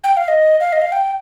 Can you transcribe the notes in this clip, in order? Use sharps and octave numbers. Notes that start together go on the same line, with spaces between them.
G5
F5
D#5
F5
D#5
F5
G5